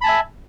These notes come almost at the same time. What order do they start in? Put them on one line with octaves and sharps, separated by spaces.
B5 A5 G#5 E5